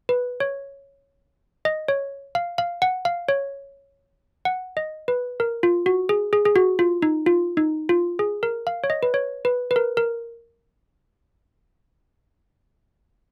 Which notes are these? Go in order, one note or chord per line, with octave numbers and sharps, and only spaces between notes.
B4
C#5
D#5
C#5
F5
F5
F#5
F5
C#5
F#5
D#5
B4
A#4
F4
F#4
G#4
G#4
G#4
F#4
F4
D#4
F4
D#4
F4
G#4
A#4
F5
C#5
D#5
B4
C#5
B4
B4
A#4
A#4